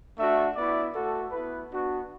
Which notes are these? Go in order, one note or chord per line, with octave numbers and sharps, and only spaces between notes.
A3 D4 F#4 E5
B3 E4 D5
A3 F#4 A4
B3 E4 B4
B3 D4 F#4